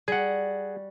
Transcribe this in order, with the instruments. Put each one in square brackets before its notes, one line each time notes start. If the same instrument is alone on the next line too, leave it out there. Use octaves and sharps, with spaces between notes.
[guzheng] G3 F#4 [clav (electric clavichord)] G#4 F#5